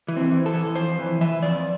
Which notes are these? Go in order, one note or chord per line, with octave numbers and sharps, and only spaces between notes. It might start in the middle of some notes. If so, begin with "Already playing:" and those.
E3
C4
E3
A4
E3
F2 C5
E3
E3 E5
F2 D5